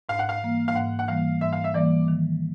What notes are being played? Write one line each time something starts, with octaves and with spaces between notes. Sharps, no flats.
G#2 F5
F#5
F5
E3 G3 A#3
F5
G#2 F#5
F#5
E3 G3 A#3 F5
G#2 E5
F5
E5
E3 G3 A#3 D5
D#3